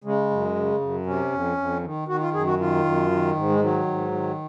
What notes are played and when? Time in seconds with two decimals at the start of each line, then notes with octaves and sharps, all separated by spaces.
0.04 C#3 G#3
0.30 F#2
0.56 C#3
0.81 F#2
1.06 C3 C#4
1.32 F2
1.57 F2
1.83 D#3
2.08 D#3 F#4
2.21 F4
2.34 F#2 G#4
2.46 F#4
2.59 D#3 F4
2.85 F#2
3.10 D#3
3.35 G#2
3.49 G#3
3.61 D#3 F#3
3.86 G#2
4.12 D#3